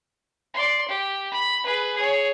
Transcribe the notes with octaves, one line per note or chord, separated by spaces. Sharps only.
D5 C6
G4
B5
G#4 B4
G#4 C#5